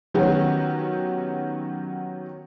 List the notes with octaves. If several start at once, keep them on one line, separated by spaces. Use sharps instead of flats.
D#3 F#3 B3 C#4 F#4 G4